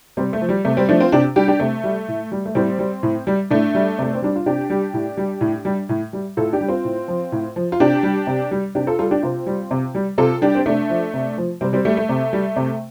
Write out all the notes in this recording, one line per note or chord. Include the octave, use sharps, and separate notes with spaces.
C3 G3 C4
A3
F3
G3
C3 A3
G3 C4
F3 A3 D4
C4 F4
C3 D4 G4
G3 D4 G4
D4 G4
C3 A3
G3
A2
G3
A3
A2 G3 C4
G3
A2
G3
A2 A3 D4
G3
C3 A3
C4
G3 D4
F4
C3 D4 G4
G3
A2
G3
A2
G3
A2
G3
A2 F4 A4
D4 G4
G3
C4 F4
A2
F3
A2
F3
F4
C3 D4 G4
G3
C3
G3
C3 D4 G4
F4 A4
G3 F4 A4
D4 G4
C3 C4 F4
G3
C3
G3
C3 F4 A4
G3 D4 G4
C4
C3 A3 D4
F3
C3
F3
C3 G3 C4
G3 C4
G3 A3
A3
C3
G3
C3